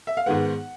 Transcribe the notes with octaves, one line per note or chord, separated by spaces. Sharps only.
E5
F5
G#2 D#3 G#3 B3 F#5